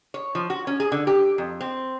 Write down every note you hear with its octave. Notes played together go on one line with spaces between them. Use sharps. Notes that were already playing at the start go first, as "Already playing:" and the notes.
C#5
F3
F#4
C#4
G#4
D3
G4
F2
C4